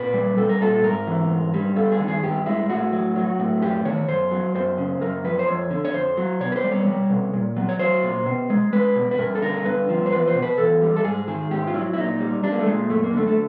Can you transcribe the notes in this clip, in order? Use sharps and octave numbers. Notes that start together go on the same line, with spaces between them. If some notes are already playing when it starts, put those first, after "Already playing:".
Already playing: A#2 B4
G3
G3 A4
A#4
A#2 A4
G#2 A#4
E3
G#2
G3
G2 A4
G#4
D#3
G#4
G2 G4
G#3 E4
A2 F#4
F#3
F#3
A2
F#2 G4
D#3 C#5
F#2 C5
F#3
F#2 C5
C#3
F#2 A#4
F3 B4
C5
F2 C#5
D3
C#5
F2 C5
F#3
B2 C#5
B4
C5
G3
C#5
G3
B2
A#2
F#3
C#5
F#3 C5
A#2
B2
G#3
G#3 B4
B2
B4
G2 A#4
A4
D3 A#4
G2 B4
F3
C5
E2 B4
C5
B2
B4
E2 A4
G3
A4
G#2 G#4
D#3 G#4
G#2 G4
F4
F#3 E4
E4
A#2 D#4
G3
G3 D4
A#3
A3
A#2 G#3
F#2 A3
A#3
D3 A3
A3